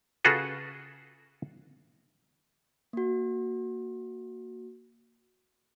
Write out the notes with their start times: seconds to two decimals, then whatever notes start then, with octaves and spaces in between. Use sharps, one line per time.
0.25 C#3 F4 F#4 G#4 A4 B4
2.93 A#3 F#4